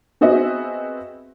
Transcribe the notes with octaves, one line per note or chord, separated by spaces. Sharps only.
B3 C4 F#4 G#4 D#5 E5